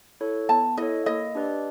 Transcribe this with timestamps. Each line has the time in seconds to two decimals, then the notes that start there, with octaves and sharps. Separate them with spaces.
0.21 E4 A4 C#5
0.49 B3 A5
0.77 E4 A4 C#5 D#5
1.06 A#3 D#5
1.35 D4 G4 B4 D5